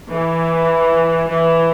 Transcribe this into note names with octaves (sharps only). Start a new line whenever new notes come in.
E3
E3